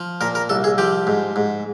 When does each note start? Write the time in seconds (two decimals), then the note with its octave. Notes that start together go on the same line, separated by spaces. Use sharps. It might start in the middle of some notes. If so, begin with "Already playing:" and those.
Already playing: F3
0.21 A#2 A#4
0.35 A#4
0.49 C2 A4
0.64 G#4
0.78 F3 G4
1.07 G#2
1.36 G#2